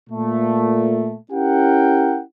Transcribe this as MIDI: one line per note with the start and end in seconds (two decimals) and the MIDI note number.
0.10 1.16 46
0.10 1.16 57
1.32 2.21 61
1.32 2.21 64
1.32 2.21 67
1.32 2.21 70
1.32 2.21 78
1.32 2.21 79